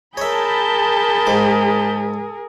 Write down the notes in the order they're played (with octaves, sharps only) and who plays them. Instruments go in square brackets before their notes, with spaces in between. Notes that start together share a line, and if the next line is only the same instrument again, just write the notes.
[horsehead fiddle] G#4 A#4 [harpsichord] C#5 E5 [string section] A5 B5 G6
[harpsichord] G#2 D6